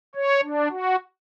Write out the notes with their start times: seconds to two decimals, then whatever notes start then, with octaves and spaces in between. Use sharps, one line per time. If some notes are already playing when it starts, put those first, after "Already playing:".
0.15 C#5
0.42 D4
0.71 F#4